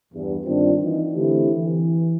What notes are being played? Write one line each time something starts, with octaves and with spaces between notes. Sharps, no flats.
E2 G2
G2 D#3 C4 D4 F4
E3 D#4 F4
D3 E3 A3 C4 E4 G4
E3